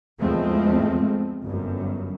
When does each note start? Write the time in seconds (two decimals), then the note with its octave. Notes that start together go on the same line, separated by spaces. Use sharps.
0.20 E2 G#2 F3 G#3 A3 C4
1.44 G1 F#2